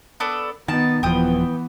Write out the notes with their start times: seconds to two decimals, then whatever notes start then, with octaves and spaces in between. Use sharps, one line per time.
0.20 B3 D4 A4
0.68 D#3 B3 D#4 A5
1.03 D#1 E3 F3 B3 G5 D#6